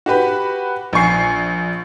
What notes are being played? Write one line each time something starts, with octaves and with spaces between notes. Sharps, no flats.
F#4 G4 B4 B5
A#1 G#5 C#6 C7